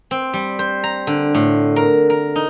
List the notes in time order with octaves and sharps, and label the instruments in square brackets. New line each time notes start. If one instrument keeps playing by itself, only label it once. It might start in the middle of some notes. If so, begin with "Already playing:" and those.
[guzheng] C4
G3
C5
A#5
D3
A2
A#4
A#4
D#4